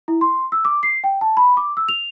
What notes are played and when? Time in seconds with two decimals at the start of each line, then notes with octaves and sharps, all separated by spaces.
0.08 E4
0.21 C6
0.52 E6
0.65 D6
0.83 C7
1.04 G5
1.21 A5
1.37 B5
1.57 D6
1.77 E6
1.89 F7